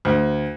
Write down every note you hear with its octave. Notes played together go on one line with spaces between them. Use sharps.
D2